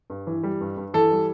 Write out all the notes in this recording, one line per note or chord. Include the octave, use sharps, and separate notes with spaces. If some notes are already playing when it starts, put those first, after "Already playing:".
G2
E3
G3
G2
G2
E3 A4
G3